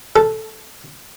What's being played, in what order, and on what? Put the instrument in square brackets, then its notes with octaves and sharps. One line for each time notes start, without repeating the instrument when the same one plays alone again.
[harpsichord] A4